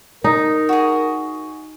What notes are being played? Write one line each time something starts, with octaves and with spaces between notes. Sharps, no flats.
D#4 A#4
F#4 G#4